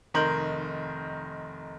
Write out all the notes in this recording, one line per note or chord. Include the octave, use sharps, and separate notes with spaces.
F1 D#3 A#4 C6 G6 F#7